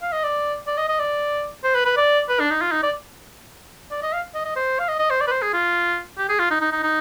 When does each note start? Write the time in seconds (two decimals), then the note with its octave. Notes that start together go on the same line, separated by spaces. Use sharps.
0.02 F5
0.13 D#5
0.23 D5
0.67 D5
0.78 D#5
0.88 D#5
0.99 D5
1.64 C5
1.75 B4
1.85 B4
1.97 D5
2.29 B4
2.40 D4
2.50 D#4
2.61 F4
2.72 D#4
2.83 D5
3.91 D5
4.02 D#5
4.13 F5
4.35 D#5
4.45 D#5
4.56 C5
4.79 F5
4.88 D#5
4.99 D#5
5.10 C5
5.21 D5
5.27 B4
5.32 C5
5.42 G#4
5.53 F4
6.18 G4
6.29 G#4
6.39 F4
6.50 D#4
6.61 D#4
6.72 D#4
6.83 D#4